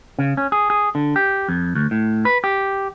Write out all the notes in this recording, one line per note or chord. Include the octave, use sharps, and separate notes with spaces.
C#3
C#4
G#4
G#4
D3
G4
F2
D2
A2
B4
G4